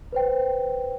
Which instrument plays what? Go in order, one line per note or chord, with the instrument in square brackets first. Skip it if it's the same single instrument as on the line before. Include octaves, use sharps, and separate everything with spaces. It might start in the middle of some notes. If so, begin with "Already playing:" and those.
[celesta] B4 C5 G5